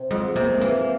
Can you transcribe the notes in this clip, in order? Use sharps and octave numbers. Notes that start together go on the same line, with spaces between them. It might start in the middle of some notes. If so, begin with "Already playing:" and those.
Already playing: C3
F2 G#3
C3 A#3
G#3
E3 A#3